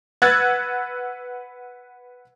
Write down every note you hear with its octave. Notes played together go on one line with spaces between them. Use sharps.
B4 F#5 E6 F#6 G#6 A6